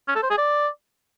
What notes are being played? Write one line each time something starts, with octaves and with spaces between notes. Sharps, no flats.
C#4
A4
C5
G#4
D5